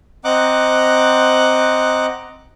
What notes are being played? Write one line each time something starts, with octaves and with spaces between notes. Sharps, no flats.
C4 D#5 F#5 A#5 D6 F#6